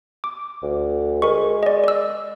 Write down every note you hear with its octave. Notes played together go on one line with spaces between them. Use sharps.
D6
D2
G#3 A#4 C#6
D5 D#5
D5 E6